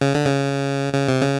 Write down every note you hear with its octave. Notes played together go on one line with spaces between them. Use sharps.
C#3
D3
C#3
C#3
C3
C#3